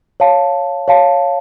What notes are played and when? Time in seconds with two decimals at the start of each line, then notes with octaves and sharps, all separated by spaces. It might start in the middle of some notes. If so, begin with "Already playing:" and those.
0.20 C#5 F5 A5
0.88 C#5 F5 A5